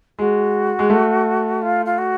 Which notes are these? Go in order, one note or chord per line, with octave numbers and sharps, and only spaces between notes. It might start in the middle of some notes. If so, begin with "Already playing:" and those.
G#3 F#4
G#3
A3
F4
F4
F#4